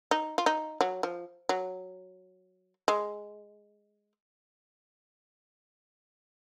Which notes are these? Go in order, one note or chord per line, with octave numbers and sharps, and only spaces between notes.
D#4
F4
D#4
F#3
F3
F#3
G#3